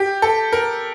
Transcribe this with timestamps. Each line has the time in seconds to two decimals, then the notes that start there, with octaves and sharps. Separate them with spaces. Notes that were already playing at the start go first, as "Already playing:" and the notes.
Already playing: G4
0.22 A4
0.53 A#4